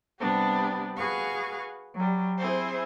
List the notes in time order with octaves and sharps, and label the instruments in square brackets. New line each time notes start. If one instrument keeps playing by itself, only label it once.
[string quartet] C3 G3 B3 D4 G4
F#4 G#4 B4 F5 C#6
F#3 G3
C4 E4 G#4 C5